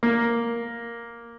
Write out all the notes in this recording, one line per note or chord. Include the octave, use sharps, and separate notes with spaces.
A#3